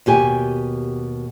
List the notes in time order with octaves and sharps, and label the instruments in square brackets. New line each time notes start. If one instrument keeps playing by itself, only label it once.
[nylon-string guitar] D#2 B2 G4 G#5